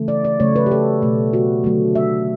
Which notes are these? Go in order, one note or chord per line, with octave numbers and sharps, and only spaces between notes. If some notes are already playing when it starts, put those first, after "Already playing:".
Already playing: C#3 E3 A3
D5
D5
C#3 F#3 A3 C#5
B4
G4
A4
B2 A3
F#4
D3 F#3 A3
E5